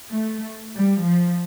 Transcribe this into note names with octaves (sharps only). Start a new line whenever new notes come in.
A3
G3
F3